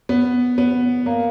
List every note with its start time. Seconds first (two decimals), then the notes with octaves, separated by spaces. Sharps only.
0.09 B3
0.58 B3
1.06 A#3